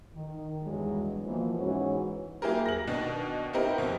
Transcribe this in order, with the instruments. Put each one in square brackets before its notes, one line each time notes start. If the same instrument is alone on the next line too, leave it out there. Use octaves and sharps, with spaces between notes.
[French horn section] D#3
E2 G2 E3 F#3 G#3
B2 E3 F3 A#3
G#2 E3 C#4 F#4 C#5
[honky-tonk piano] F#3 A#3 E4 G4 G#4 A#4
A#6 F#7
B2 D#3 D4
B3 C4 D#4 E4 G4 A#4
F2 B2